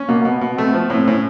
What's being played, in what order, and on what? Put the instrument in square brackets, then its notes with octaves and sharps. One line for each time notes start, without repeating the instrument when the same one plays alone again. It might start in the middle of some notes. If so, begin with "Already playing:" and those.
Already playing: [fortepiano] C#4
[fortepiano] B2 [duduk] A#3
[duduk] A#3
[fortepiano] B2 [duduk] B3
[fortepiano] B2
[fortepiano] A3 [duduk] C4
[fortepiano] F3 [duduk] B3
[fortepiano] A2 [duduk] C4
[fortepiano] A2 [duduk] C#4